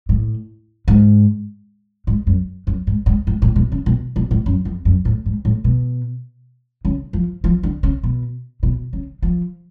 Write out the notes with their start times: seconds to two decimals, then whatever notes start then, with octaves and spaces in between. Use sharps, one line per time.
0.09 A2
0.88 G#2
2.07 G#2
2.27 F#2
2.67 F#2
2.87 G#2
3.06 G#2
3.27 G#2
3.42 A2
3.56 B2
3.72 C#3
3.86 B2
4.16 B2
4.31 A2
4.46 F#2
4.65 F2
4.85 F#2
5.05 A2
5.26 G#2
5.45 A2
5.64 B2
6.85 C#3
7.13 F3
7.44 F3
7.63 D3
7.83 C#3
8.03 B2
8.63 B2
8.93 C#3
9.22 F3